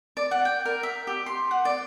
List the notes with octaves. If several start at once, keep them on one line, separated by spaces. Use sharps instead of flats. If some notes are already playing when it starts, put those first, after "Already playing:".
D5
F#5
G5
A#4
E5
G4
C6
F#5
D5